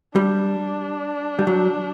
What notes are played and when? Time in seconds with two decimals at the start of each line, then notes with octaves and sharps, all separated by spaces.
0.15 G3 D4
1.39 G3
1.47 F#3